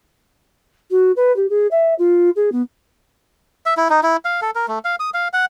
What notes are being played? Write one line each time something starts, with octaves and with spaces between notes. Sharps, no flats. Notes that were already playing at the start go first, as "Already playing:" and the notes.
F#4
B4
G4
G#4
E5
F4
G#4
B3
E5
E4
D#4
E4
F5
A4
A#4
A3
F5
D#6
F5
F#5